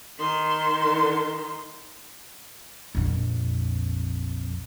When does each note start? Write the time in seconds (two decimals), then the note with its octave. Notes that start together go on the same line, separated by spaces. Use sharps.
0.18 D#3 C6
2.95 A#1 F2